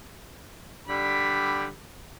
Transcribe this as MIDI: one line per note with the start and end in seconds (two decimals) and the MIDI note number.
0.88 1.68 50
0.88 1.68 55
0.88 1.68 83